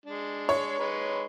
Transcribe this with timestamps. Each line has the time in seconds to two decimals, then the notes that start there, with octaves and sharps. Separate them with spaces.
0.06 G#3 D4
0.49 C#5
0.79 G#3 D#4 B4